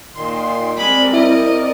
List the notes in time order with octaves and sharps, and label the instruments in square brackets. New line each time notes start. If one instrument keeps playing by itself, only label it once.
[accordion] A#2 D#3 C6
[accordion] G3 [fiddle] G#3 B5 [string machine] C4 A#4 D5
[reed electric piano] E4 [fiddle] D#5